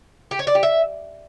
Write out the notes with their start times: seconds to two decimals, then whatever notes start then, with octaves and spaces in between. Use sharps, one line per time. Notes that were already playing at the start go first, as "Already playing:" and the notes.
0.31 G4
0.39 C#5
0.47 D5
0.55 G4
0.63 E5